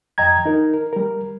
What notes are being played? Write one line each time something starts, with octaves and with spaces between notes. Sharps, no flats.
F2 D#5 G5 A#5 G#6
D#4 A#4
A#4
G3 A#4